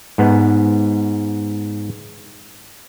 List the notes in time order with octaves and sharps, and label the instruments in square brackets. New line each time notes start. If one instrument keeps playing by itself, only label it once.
[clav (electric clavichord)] G#2 B3